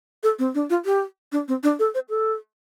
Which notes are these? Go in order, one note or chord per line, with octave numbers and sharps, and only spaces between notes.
A4
C4
D4
F4
G4
D4
C4
D4
A4
C5
A4